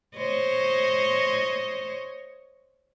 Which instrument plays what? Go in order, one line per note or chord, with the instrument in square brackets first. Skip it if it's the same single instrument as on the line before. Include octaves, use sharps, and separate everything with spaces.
[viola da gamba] C5 C#5 D#5